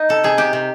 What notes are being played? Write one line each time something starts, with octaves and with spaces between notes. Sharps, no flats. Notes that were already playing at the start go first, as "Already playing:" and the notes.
Already playing: D#4
C3 A4
C3 G#4
C3 G4
C3